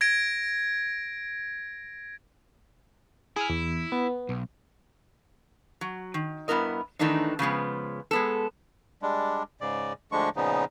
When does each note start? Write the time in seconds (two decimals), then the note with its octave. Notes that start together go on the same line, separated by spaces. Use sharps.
0.01 G#6 A#6 D7
3.36 E4 G#4 D#6 F6
3.50 E2
3.92 B3
4.29 B1
5.81 F#3
6.14 D#3
6.48 G2 B3 E4 A#4 D#5
6.99 D#3 E3 A3 D4 D#4
7.39 C#3 F3 G#3 B3
8.11 G#3 B3 A4
9.02 G3 G#3 D4
9.61 G#2 C#3 D5
10.12 D2 D3 F3 G#3 D4 C#6
10.36 A#2 C#3 F3 B3 D#4